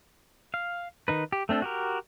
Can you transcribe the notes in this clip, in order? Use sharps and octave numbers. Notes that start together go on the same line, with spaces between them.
F5
D#3 D#4 B4
G4
A3 C4 D4 A4
F#4 G4 A#4